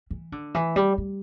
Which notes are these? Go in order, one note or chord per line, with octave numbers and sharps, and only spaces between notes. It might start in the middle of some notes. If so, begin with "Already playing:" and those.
E3
D3
E3
G3
G3